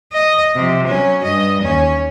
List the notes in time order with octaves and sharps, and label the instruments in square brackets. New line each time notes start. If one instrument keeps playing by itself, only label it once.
[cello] D#5
C3 F3
F#3 C#4
G2 D#5
D#2 C#4